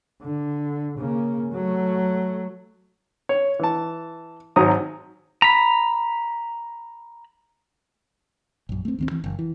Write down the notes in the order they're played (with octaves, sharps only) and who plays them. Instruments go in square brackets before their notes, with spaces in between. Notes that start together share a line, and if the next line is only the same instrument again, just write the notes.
[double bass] D3
C#3 A#3
F#3 A3
[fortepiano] C#5
E3 A5
G#1 F#3 A#5 D#6
[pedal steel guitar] A#5 B5
[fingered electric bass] A#1 F#2
A3 C4
D2 D#3 C4
E3
F#1
E3